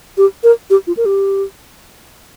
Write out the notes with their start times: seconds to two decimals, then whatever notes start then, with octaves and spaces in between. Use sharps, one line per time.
0.18 G4
0.44 A#4
0.70 G4
0.87 F4
0.97 A#4
1.06 G4